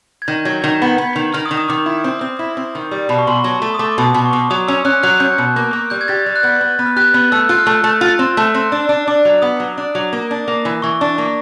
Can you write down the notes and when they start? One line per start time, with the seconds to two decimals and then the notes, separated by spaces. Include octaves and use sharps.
0.22 G#6
0.28 D#3 G6
0.45 F#3 G#6
0.63 D#3 G6
0.82 B3
0.98 B3
1.16 D#3
1.34 D#3 F6
1.46 D#6
1.51 D#3
1.57 D#6
1.69 D#3 D6
1.86 E4
2.04 C4
2.21 C4
2.39 E4
2.57 C4
2.75 D#3
2.91 G3
3.09 B2 B5
3.19 C#6
3.27 B2 C6
3.36 C#6
3.44 F#3
3.62 A3
3.74 D#6
3.79 A3 D6
3.92 D6
3.98 B2
4.04 D#6
4.14 B2 D6
4.25 C#6
4.33 B2 D6
4.50 F#3 D#6
4.68 C#4 E6
4.85 C#4 F#6
5.03 F#3 F#6
5.20 C#4 G6
5.38 B2
5.56 A#3
5.73 A#3
5.90 G3 G6
6.01 G#6
6.08 G4 A6
6.26 G3
6.36 F#6
6.43 B3 G6
6.61 B3
6.79 B3
6.86 F6
6.96 G4 F#6
7.14 B3
7.32 A3 E6
7.49 F4 F#6
7.58 F6
7.66 A3 E6
7.84 A3
8.01 F4
8.19 C4
8.37 A3
8.54 C4
8.72 D4
8.89 D4
9.07 D4 D6
9.25 F#3
9.42 B3 D#6
9.60 F#3
9.77 D4
9.95 F#3
10.13 A#3
10.31 D4
10.48 A#3
10.65 E3
10.82 E3 C#6
11.01 D4
11.18 A#3